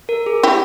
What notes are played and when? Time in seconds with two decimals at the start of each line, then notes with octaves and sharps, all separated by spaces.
0.09 A#4
0.26 G#4
0.43 E4 G4